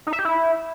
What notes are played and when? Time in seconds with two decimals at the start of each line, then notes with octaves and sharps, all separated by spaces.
0.07 D#4
0.13 E5
0.19 G4
0.25 E4